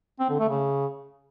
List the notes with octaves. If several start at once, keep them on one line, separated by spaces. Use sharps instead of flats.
C4
D3
A3
C#3